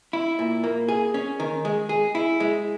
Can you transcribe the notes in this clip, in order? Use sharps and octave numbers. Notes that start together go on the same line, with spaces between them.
E4
A#2
A#3
G#4
C#4
D#3
G#3
G#4
E4
G#3